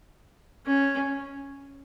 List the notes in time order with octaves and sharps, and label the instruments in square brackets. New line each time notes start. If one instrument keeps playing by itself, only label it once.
[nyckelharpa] C#4